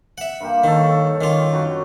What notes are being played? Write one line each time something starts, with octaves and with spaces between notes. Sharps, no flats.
E5 F#5
G2 A#3 G4
D#3 A4 C#5 F5
D#3 C#4 F4 D6
F#2 F#4